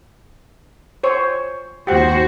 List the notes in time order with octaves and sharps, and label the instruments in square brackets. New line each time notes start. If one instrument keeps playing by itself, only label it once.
[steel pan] C5 C#5
[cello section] D#2 F#4 C5 [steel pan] G4 F#5